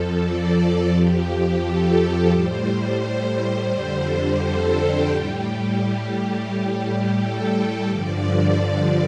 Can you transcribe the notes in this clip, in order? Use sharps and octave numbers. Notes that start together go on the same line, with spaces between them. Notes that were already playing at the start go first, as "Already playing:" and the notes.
Already playing: F2 F3 A4
D5
A4
F2 F3 G4
A4
A2 G3 C5
C5
F2 D3 G3
A4
G4
A2 G3 G4
A2 G3
A4
G4
G2 D3 F3 D5
D5
D5